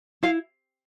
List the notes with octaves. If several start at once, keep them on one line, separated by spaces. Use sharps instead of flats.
E4 F5